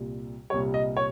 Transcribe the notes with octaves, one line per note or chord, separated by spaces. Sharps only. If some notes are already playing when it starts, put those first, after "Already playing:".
Already playing: C2 A#2 G3
C2 A#2 G3 C#5
D#5
C#5